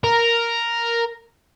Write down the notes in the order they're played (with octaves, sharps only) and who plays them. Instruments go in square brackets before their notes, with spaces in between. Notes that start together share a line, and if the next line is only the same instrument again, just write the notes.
[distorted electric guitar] A#4